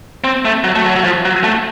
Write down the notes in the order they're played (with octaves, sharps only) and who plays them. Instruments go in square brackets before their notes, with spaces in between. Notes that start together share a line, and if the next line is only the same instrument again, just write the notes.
[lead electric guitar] C4
A3
F#3
A3
F#3
F#3
F3
F#3
A3